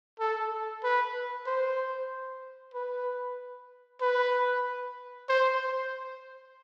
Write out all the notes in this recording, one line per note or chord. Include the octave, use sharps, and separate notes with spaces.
A4
B4
C5
B4
B4
C5